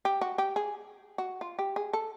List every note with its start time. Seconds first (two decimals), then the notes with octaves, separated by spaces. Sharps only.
0.05 G4
0.21 F#4
0.38 G4
0.56 G#4
1.18 F#4
1.41 F4
1.59 G4
1.76 G#4
1.93 A4